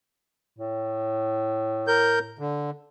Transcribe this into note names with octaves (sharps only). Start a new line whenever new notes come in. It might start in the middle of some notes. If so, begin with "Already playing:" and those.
A2
A#4 G6
D3